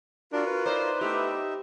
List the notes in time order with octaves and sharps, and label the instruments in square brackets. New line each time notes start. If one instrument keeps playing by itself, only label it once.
[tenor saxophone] D4 [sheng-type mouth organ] F4 A#4 [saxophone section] F#4
[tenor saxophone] B4
[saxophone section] D#4 E4 D5 [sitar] C5
[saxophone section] A3 B3 E4 [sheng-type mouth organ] D#4 E5 [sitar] G4